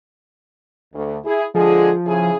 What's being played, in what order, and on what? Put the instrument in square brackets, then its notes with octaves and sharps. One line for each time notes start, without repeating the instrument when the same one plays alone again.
[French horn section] D2
E4 G#4
[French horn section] D3 G#3 G#4 [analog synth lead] F3
[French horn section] C#3 E4 G#4